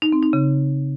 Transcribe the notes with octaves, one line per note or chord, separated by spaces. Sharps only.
D#4
C4
D#4
C#3